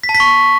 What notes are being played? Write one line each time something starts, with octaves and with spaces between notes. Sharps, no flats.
B6
A5
B6
C#6